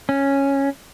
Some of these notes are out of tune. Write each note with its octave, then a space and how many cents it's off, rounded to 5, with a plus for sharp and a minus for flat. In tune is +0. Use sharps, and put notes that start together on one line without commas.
C#4 -5